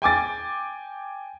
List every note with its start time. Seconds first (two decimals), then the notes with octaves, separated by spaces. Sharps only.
0.02 G5 G#5 D6 A6